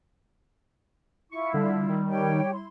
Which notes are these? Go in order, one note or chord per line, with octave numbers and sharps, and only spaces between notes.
E4 F4 C#6
D3 G3
D#3
G4 C#5 G5
E4 C6